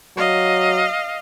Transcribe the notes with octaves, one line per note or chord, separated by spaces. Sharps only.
F#3 D#5 F5